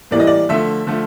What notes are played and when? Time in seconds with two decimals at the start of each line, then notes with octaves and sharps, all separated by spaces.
0.11 A2 E3 G3 A#3 D5
0.20 D#5
0.27 D5
0.49 D3 F3 A3 E5
0.87 D3 F3 A3